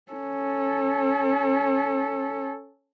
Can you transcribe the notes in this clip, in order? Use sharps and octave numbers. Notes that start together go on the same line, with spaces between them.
C#4 A4